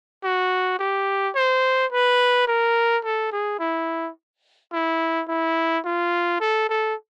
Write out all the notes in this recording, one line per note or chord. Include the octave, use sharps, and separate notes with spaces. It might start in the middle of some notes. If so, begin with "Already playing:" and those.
F#4
G4
C5
B4
A#4
A4
G#4
E4
E4
E4
F4
A4
A4